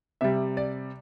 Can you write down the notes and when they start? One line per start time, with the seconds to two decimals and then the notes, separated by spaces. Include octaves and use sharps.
0.21 C3 G3 E5
0.57 D5